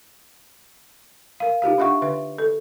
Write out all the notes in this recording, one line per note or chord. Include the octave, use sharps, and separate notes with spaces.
A#4 F5
D#4 F4 G4 F5
D4 F4 E5 F#5 C#6
D3 B4 E5
A4